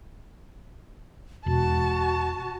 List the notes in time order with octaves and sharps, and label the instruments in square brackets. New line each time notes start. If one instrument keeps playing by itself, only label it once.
[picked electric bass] E1 [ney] F#4 [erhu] A5